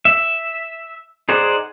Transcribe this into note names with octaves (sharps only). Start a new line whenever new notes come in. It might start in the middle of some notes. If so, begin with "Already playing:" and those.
E5
D#4 G#4 C5 D5 F#5